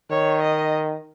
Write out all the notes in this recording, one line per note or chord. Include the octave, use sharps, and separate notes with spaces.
D#3 C#5
D#5